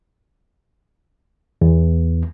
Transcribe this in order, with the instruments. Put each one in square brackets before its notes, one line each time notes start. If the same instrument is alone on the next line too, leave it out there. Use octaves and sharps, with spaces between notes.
[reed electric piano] E2